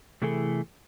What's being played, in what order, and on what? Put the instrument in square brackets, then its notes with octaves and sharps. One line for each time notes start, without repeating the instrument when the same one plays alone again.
[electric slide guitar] C3 E3 A3 E4 G#4 A4